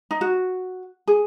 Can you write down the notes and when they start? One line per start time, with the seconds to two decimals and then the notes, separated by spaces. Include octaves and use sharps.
0.11 D#4
0.21 F#4
1.07 G#4